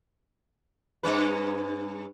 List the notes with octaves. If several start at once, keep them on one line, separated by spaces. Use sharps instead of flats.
G2 C#4 B4